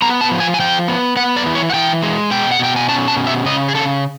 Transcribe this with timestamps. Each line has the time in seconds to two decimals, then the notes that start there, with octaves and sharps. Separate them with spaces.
0.02 B3 A#5
0.21 A5
0.31 F3
0.40 G#5
0.54 G#5
0.59 F3 G5
0.88 B3
1.16 B3 F#5
1.36 D5
1.46 E3
1.55 C#5
1.70 F#5
1.74 E3 G5
2.02 G#3
2.31 B2 G5
2.51 F#5
2.59 B2 G5
2.76 G#5
2.88 C#4 A5
3.08 A5
3.17 B2
3.27 E5
3.46 C#3 D#5
3.69 G#4
3.75 C#3 A4